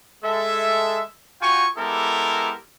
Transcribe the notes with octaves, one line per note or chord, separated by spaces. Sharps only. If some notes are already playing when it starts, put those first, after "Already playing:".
G#3 A4 E5
F4 F#4 F5 G5 G#5 C#6
G#3 B3 E4 G4 A4 A#4